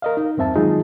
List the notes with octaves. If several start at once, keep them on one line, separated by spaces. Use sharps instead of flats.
A#4 D#5 F5
D#4
E2 G2 C4 E5 A5
D#3 F#3 G#3 D#4 F4 G#4